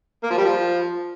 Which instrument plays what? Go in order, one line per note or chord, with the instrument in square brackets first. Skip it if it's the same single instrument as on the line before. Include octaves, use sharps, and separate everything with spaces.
[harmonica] A#3
F3
G3
F3